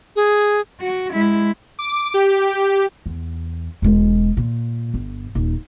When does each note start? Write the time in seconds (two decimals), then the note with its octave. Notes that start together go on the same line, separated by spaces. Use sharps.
0.16 G#4
0.80 F#4
1.12 G#3 E4
1.79 D6
2.14 G4
3.06 E2
3.82 E1 G#3
4.37 A#2
4.94 G1
5.35 D#1 D#4